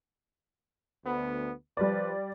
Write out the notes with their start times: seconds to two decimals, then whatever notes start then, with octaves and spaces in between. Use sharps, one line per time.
1.05 D2 B3
1.77 F3 G3 B4 D5